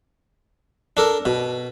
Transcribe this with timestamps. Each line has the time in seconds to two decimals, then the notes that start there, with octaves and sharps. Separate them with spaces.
0.97 D4 A4 A#4
1.25 B2